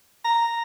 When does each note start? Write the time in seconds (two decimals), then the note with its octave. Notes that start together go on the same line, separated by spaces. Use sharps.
0.25 A#5